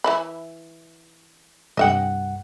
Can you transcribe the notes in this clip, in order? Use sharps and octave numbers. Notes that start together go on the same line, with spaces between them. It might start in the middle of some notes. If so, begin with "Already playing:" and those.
E3 E4 B5
C2 G2 D#5 E5 F#5 G5